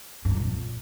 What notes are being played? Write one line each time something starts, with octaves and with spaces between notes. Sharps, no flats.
G2
F2
A#2